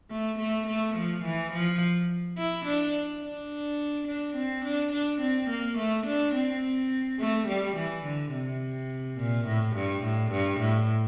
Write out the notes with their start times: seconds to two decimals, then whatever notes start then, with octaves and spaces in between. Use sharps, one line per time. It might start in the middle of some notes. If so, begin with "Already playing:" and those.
0.11 A3
0.39 A3
0.67 A3
0.96 F3
1.25 E3
1.53 F3
2.38 E4
2.66 D4
3.22 D4
4.08 D4
4.36 C4
4.65 D4
4.93 D4
5.21 C4
5.50 A#3
5.78 A3
6.06 D4
6.35 C4
7.19 A3
7.48 G3
7.76 E3
8.05 D3
8.33 C3
9.18 A#2
9.46 A2
9.75 G2
10.03 A2
10.32 G2
10.60 A2